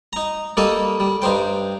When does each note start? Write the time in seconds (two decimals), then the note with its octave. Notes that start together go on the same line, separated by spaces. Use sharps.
0.13 D#4 A#5
0.57 G3 A#3 D#4 A4 D#5
1.00 G3
1.22 G2 D#4 C5 G5